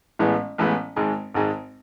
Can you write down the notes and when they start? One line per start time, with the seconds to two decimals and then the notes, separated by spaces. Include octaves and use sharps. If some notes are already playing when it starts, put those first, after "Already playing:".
0.19 A1 A2 E3 G#3 B3
0.58 A1 A2 E3 G#3 B3
0.96 G#1 G#2 G#3
1.34 G#1 G#2 G#3